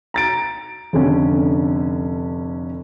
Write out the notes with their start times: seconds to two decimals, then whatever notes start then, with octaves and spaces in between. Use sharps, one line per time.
0.14 A#5 A6 D7
0.93 F1 D3 C#4